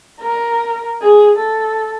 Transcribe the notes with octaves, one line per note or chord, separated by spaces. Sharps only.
A#4
G#4
A4